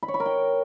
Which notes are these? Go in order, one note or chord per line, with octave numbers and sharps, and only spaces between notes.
B5
C#5
B5
A#4
G5